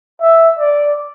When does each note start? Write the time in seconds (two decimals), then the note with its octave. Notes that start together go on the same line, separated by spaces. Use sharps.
0.21 E5
0.59 D5